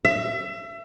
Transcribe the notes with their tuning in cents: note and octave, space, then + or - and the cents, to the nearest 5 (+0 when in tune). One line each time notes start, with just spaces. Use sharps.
E5 +30